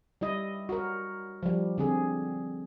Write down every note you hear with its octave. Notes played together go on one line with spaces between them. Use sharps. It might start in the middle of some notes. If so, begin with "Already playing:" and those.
G3 E4 D#5
F#4 A#4
F3 G3
D3 C4 G#4